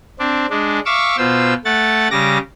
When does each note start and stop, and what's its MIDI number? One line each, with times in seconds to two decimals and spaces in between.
0.19 0.47 60
0.19 0.47 62
0.50 0.80 56
0.50 0.80 62
0.86 1.16 76
0.86 1.16 77
0.86 1.16 85
0.86 1.16 86
0.86 1.16 88
1.18 1.54 47
1.18 1.54 65
1.18 1.54 72
1.18 1.54 88
1.65 2.08 57
1.65 2.08 78
1.65 2.08 93
2.11 2.38 49
2.11 2.38 55
2.11 2.38 86
2.11 2.38 94